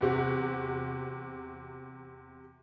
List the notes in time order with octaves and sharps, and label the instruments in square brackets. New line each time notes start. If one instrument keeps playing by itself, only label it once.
[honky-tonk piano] E2 C3 F#4